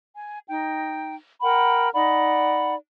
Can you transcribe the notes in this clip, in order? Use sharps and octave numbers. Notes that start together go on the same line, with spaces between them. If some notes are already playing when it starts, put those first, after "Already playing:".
G#5
D#4 G5
A#4 F#5 G5 B5
D#4 D5 F#5 B5